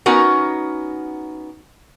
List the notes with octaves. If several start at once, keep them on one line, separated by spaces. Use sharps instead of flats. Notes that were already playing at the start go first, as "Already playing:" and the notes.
B3 C#4 D#4 F#4 A#4